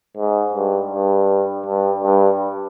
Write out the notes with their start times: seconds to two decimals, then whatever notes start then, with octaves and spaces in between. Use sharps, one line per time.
0.17 G#2
0.54 G2
0.91 G2
1.66 G2
2.03 G2